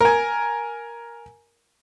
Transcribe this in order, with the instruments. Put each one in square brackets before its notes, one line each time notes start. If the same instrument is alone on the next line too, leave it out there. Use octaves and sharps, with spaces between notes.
[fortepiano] A#4 G#5